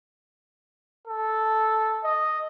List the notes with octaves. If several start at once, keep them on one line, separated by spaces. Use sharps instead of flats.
A4
D#5